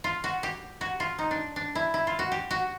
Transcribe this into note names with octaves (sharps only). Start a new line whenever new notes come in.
F4
F#4
G4
F#4
F4
D#4
D4
D4
E4
E4
F4
F#4
G4
F#4